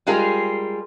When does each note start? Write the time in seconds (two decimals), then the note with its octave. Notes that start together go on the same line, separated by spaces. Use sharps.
0.07 G3 G#3 F4 G#4 A#4